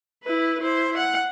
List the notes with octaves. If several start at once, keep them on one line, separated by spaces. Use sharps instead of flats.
E4 B4
E4 C5
F#5